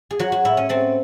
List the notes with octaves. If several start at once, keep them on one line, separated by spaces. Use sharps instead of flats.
G#4
F#3 F#4
F#4
A2 E4
C#4
A3 C4